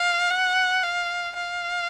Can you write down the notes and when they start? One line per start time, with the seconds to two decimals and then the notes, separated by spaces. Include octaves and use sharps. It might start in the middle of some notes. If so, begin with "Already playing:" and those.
Already playing: F5
0.30 F#5
0.83 F5
1.36 F5